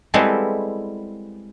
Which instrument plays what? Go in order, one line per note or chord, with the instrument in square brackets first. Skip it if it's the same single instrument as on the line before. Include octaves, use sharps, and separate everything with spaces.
[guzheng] G3 G#3 B3 C4 E4 A4